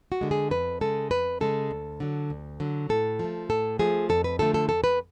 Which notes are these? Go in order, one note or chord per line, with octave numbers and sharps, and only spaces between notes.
F#4
D3 G#3
G#4
F2 B4
C#3 G#3 A4
F2 B4
C#3 G#3 A4
D2
D3 F#3
D2
D3 F#3
A2 A4
F3 A3
A2 A4
F3 A3 G#4
F2 A4
B4
D3 F3 A3 A4
A4
F2 A4
B4